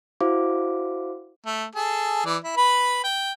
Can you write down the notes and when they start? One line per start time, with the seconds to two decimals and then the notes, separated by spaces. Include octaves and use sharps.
0.21 E4 F#4 C5 F5 D6
1.46 A3
1.75 G#4 A4
2.25 E3 D5
2.44 E4
2.57 B4 B5
3.04 G5